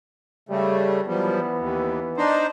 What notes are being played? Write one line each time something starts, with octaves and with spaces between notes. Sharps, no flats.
C#3 G3 A3
F#2 E3 F3 G3 B3
D#2
D4 D#4 C5